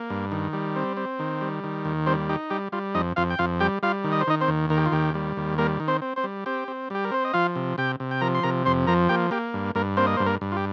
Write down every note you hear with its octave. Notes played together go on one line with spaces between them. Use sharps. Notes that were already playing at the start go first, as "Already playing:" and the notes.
Already playing: A#3
G2
D#3
G3
C4
C4
D#3
G3
D#3
D#2
G3 C4 C5
D#4 G4
G3 G4
G3 F4
F2 D#4 D#5
F2 F4 F5
G5
F2 F4 F5
G3 G4 G5
G3 F4 F5
D#3
D#5
C5
D#3 D#4 D#5
C4 C5
D#2
D#3 A#4
G4
F4
D#2 G4
G3
D#2
G3 A#3 A#4
D#3
C4 C5
C4
C4 C5
G3
C4 G4
C4
G3 G4
A#4
C4 C5
D#5
F3 F4 F5
C3
C3 G4 G5
C3
G5
F3 A#4 A#5
C6
C3 A#4 A#5
F2 C5 C6
F3 A#4 A#5
A#3 G4 G5
A#3 G4
G2
G2 A#3 A#4
A#3 C4 C5
D#5
G2 C5
A#3 A#4
G2
F4
G4